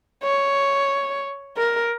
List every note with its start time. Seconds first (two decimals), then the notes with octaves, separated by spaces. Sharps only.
0.23 C#5
1.58 A#4